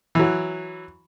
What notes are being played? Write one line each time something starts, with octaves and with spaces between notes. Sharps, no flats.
E3 F#3